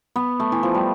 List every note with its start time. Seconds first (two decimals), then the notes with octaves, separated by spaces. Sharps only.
0.16 B3
0.40 A3
0.52 E3
0.63 F3
0.74 G3